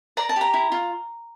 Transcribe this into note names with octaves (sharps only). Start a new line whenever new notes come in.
D5 A#5
A5
G4 A#5
E4
F4